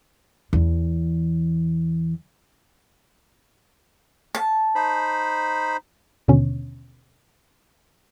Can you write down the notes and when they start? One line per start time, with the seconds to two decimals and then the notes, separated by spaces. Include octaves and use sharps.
0.53 E2 E3
4.35 A5
4.75 D#4 C5 B5
6.28 D#2 B2 D3 C#4